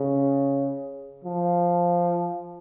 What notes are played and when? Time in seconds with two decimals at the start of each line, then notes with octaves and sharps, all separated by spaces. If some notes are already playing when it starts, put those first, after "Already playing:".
Already playing: C#3
1.25 F3